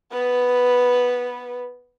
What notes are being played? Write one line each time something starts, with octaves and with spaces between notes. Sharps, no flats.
B3 B4